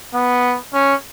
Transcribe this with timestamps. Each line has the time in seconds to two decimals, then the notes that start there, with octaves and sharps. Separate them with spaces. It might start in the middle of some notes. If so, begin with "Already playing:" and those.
0.14 B3
0.74 C#4